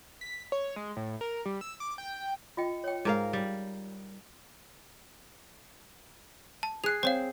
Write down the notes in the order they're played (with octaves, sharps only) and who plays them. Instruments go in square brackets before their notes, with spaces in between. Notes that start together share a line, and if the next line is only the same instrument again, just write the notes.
[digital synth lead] B6
C#5
G#3
A2
A#4
G3
E6
D6
G5
[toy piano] F4 D#5 G5
C#5 G5
[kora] G#2 A#4 F5
G3
[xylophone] A5
[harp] G#4 C7 [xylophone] F#6 F7
[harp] C4 [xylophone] C5 C#5 F5